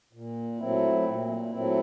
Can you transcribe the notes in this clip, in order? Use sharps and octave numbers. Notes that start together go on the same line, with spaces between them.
A#2
F#3 A3 C4 E4
A#2
F#3 A3 C4 E4